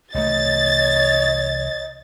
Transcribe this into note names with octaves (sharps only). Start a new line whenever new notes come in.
C2 E3 A3 C#5 D#5 A6